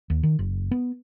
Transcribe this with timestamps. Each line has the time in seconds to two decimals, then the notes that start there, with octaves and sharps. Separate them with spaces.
0.10 D#2
0.23 D#3
0.39 F#1
0.71 B3